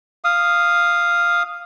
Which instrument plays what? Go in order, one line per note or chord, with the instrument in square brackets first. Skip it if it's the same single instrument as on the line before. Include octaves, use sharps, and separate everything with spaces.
[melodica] F5 D#6